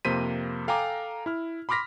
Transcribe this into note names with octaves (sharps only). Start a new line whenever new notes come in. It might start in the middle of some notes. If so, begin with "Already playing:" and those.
F2 C3 A#3 C5 B6 D#7
A4 F5 G5 G#5 A#5 D6
E4 F6
B5 C6 D6 F6 A#6 B6